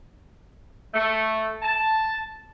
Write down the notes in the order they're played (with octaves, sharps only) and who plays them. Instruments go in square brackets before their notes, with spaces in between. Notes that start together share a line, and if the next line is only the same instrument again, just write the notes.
[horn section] A3
A5